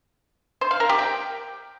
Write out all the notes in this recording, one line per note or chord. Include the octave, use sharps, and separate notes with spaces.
C5
F5
A#4
G4
G5